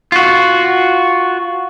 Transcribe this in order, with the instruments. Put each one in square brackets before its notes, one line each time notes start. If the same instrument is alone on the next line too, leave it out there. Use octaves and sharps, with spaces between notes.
[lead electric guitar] F4 F#4